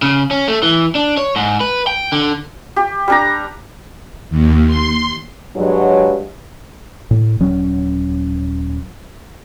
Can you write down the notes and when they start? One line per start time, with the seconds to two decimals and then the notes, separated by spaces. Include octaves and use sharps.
0.02 C#3
0.31 C#4
0.48 A3
0.63 E3
0.95 D4
1.17 C#5
1.36 G#2
1.60 B4
1.87 G5
2.12 D3
2.76 G4
3.08 G3 D4 A#5
4.30 D#2
4.66 C6
5.56 G2 F#3 G#3
7.11 A2
7.40 D#1 F#3 C#4